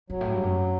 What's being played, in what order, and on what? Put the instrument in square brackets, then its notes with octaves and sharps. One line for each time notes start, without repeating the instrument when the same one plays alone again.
[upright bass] F#2 [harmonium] F#3
[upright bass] A2
G2
F#2